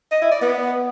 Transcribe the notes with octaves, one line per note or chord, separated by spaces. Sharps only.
D#5
E4
D5
B3